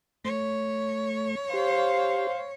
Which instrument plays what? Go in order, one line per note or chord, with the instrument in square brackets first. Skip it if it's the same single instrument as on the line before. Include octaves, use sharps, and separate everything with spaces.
[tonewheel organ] A3 [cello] C#5
[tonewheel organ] G4 [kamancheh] C5 F5